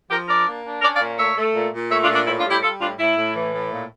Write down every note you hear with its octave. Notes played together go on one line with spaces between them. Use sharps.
F3 G4 A#4
D4 A#4 D5
A#3
D4
C#4 A#4 D5
D5 F5
A#2
A3 C#5 E5
A3
A#2
A#2
A3 C#5 E5
D4 F4
A#2
D4
A2 E4
D4 F4
G3
E4 G4
G3 F4 A4
A2 D4 F4
A2 E4
A2
E3
A2
A#2